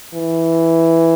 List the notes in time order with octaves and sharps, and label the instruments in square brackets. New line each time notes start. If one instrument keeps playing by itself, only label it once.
[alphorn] E3